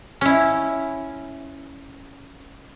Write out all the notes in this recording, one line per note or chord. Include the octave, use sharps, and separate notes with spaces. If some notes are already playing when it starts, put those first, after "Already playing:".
C#4 E4